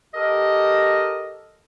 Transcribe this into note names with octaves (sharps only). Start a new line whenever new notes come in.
G4 A4 A#4 D#5